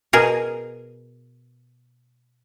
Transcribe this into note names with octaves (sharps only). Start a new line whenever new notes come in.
B2 G#4 A#4